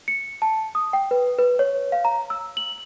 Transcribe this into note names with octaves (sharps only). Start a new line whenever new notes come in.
C#7
A5
D#6
G5
B4
B4
C#5
F5
A#5
E6
F#7